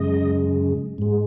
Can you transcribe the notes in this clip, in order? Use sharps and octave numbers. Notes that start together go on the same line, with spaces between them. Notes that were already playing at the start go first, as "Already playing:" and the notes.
Already playing: F#2 C#3 G#3 D#5
G#2 G#3